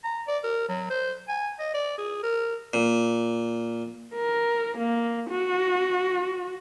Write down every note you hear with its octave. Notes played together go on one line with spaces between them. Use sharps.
A#5
D5
A#4
F#3
C5
G#5
D#5
D5
G#4
A#4
A#2
A#4
A#3
F#4